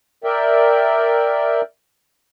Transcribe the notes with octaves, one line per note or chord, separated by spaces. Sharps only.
A#4 D5 E5 G5